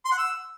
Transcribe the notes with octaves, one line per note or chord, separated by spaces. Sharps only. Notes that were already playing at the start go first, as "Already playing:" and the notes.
C6
F#5
E6